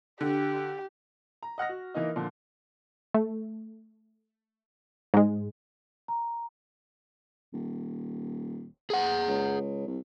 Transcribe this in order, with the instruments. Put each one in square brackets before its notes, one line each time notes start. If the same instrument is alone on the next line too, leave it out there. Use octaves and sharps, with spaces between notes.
[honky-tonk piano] D3 [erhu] G4
[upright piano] A#5
D#5 F#5 F6 A#6
F#4
E3 A#3 D#4 D#5
A#2 D3 F3
[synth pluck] A3
G#2 G#3
[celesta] A#5
[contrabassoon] D#1
[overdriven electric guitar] G#4 F#5
[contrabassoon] C#2
C2